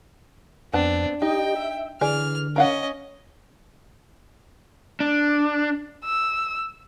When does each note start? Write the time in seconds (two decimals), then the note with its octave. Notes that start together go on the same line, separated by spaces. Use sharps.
0.73 F2 B3 C4 D4 A5
1.22 D#4 G4 D#5 G5
1.56 E5
2.01 D3 E3 G#4 D5 F6
2.56 C#4 A#4 D#5 F5 F#5
5.00 D4
6.04 E6